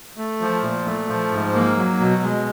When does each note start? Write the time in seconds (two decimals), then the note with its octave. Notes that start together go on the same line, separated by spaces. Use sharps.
0.17 A3
0.41 F3
0.63 A#2
0.85 A3
1.08 F3
1.31 G#2
1.54 A#3
1.76 F#3
2.00 B2
2.22 G#3